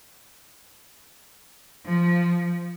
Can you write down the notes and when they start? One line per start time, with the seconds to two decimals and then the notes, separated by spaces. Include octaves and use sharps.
1.84 F3